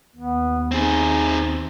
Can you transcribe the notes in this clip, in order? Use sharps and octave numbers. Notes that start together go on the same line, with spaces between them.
D#2 B3
C4 D#4 G#4